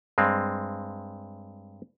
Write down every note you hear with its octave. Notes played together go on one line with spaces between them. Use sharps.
G2 G#3 C4